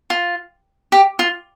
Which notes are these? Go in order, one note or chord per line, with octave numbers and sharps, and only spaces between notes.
F4
G4
F4